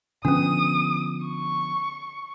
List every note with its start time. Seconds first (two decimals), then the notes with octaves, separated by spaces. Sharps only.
0.25 D3 F3 B3 C#4 D4 D#6
1.26 C#6